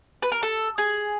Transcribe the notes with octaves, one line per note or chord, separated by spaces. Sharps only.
B4
A#4
A4
G#4